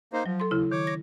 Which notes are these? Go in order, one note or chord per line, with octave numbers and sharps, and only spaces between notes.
A#3 D#4 C5
F3 F#3
A4 C6
D#2 C#3 E4
D#3 C#5 D6
A#6